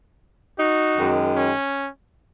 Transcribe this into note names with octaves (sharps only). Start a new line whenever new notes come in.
D#4 F#4
F#2 D#3 G#3
C#4